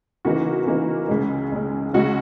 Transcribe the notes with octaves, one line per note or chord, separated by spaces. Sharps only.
C#3 E3 A#3 D#4 F#4
C#3 E3 A#3 D#4
C#2 C#3 G#3
C#2 C#3 G#3
C#2 C#3 G#3 F#4